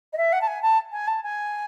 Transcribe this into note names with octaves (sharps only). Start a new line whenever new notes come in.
D#5
E5
F#5
A5
G#5
A5
G#5
A5
G#5